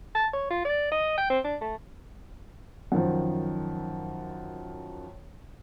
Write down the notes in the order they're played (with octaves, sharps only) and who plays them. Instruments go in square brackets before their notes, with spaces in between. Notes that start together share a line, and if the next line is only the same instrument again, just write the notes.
[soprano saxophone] A5
C#5
F4
D5
D#5
G5
C4
D4
A3
[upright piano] F#2 D#3 F3